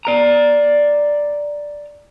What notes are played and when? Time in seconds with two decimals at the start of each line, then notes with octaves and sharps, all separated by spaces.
0.05 D5 A#5